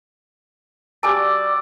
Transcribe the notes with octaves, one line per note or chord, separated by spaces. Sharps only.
G3 F#4 D5 G#5 A5 D6 E6